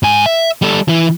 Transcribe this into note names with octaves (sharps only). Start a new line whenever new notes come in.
G#2 G#5
E5
G3 A4
E3 E4